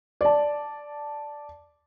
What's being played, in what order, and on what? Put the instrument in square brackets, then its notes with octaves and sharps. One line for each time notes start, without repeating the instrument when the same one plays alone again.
[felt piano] D5 A5